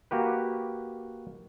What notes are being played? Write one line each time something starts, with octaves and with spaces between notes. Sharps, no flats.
A#3 F#4 G4 B4